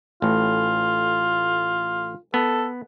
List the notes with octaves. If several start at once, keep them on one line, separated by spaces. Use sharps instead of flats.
A1 A2 F4
B3 A4